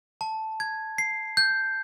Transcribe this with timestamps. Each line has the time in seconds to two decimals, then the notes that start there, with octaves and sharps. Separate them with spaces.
0.21 A5
0.60 G#6
0.98 C7
1.37 G6